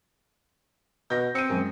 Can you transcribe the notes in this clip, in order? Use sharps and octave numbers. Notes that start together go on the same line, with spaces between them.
B2 G6 A#6
C4 C#7 D#7
F#2 G#3